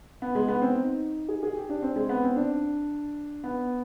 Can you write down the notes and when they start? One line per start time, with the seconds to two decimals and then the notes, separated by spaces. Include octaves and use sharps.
0.22 B3
0.35 G#3
0.48 B3
0.62 C4
0.75 D#4
1.29 G#4
1.43 G#4
1.56 G4
1.69 D4
1.82 C4
1.96 G#3
2.09 B3
2.23 C4
2.36 D4
3.44 B3